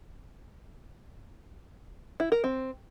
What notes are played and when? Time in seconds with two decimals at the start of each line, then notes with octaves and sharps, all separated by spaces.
2.20 E4
2.32 A#4
2.44 C4